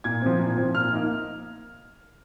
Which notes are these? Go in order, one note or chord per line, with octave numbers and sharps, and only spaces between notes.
A#2 G#6
F3 C4
A#2
F3 C4
A#2 F6
A#3 D#4